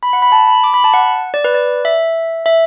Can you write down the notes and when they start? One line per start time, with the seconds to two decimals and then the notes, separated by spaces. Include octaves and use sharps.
0.03 B5
0.13 F#5
0.22 B5
0.32 A5
0.47 B5
0.64 D6
0.74 B5
0.84 A5
0.93 F#5
1.34 D5
1.44 B4
1.54 D5
1.85 E5
2.46 E5